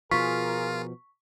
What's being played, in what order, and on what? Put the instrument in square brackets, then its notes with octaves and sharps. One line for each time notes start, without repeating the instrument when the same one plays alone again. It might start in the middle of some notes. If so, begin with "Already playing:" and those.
[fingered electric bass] B2 F3 [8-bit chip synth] F4 [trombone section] G#4 A#4 [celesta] C#6 B6